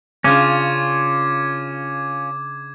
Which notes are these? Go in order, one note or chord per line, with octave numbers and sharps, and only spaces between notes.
C#3 C#4 D4 F4 D6 G#6